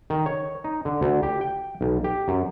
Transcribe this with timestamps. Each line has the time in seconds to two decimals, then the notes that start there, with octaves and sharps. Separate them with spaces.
0.10 D#3
0.26 C#5
0.64 D#4
0.85 D3
1.01 D2
1.23 G4
1.41 G5
1.81 B1
2.04 G4
2.28 F#2